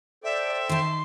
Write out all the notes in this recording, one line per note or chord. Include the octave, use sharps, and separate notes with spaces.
A4 C5 D5 E5 G5
D#3 A5 C6